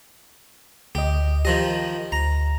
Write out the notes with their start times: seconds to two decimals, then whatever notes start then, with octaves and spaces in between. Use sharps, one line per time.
0.95 D2 G4 D#5
1.45 D#3 F3 G4 D#5
2.12 D2 A#5